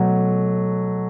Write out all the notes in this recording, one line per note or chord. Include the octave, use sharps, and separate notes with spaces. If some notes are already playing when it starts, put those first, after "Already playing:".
Already playing: B2 F#3 A3